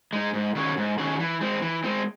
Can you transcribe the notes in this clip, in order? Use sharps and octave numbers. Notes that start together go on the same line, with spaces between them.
G#3 D#4
G#2
D#3 F#3 C#4 G#4
G#2
D#3 F#3 C#4 G#4
E3
G#3 C4
E3
G#3 C4